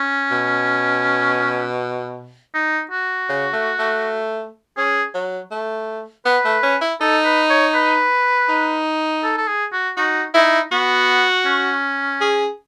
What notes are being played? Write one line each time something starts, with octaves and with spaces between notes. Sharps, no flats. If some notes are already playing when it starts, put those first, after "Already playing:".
Already playing: C#4
B2
D#4
F#4
C#3
A3
A3
C#4 G#4
F#3
A3
B3 B4
A3
C#4
E4
D#4 A4
B4
C#5
B4
D#4
A4
A4
G#4
F#4
D#4 F#4
D#4 E4
B3 F#4
C#4
G#4